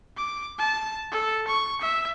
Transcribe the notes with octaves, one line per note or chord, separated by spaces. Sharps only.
D6
A5
A4
C#6
E5